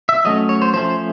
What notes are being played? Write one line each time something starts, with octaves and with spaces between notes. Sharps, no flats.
E5
F#3 A3 C#4 D#5
C#5
C5
F3 A3 C#4 C5